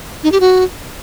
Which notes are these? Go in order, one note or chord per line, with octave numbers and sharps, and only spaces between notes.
D#4
G4
F#4